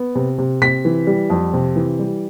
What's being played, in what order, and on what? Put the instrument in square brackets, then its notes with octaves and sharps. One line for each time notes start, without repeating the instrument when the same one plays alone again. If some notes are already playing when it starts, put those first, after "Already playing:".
Already playing: [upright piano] B3
C3
C3
C3 B6
E3
G3
F2
C3
E3
G3